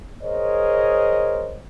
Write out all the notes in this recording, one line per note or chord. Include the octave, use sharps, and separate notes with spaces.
G#4 A#4 C5 C#5 D#5